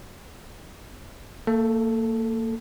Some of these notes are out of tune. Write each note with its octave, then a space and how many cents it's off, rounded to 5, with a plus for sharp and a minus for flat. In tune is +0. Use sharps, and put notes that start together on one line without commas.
A#3 -30 A4 +0